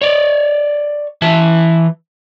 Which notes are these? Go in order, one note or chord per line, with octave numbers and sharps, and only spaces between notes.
C#5 D5
E3 E5 A5